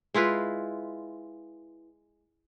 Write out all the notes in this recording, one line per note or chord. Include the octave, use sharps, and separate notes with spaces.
G#3 E4 F4 B4